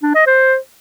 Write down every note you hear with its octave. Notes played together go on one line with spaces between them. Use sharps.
D4
D#5
C5